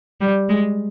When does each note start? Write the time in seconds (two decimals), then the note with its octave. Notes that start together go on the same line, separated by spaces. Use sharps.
0.20 G3
0.49 G#3